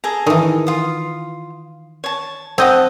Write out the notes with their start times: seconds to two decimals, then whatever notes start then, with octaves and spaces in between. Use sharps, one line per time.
0.04 G#4 A4 A#5
0.27 D#3 E3
0.67 F4 D#6
2.04 C#5 A5
2.58 C4 D#5 F#5 G5 A5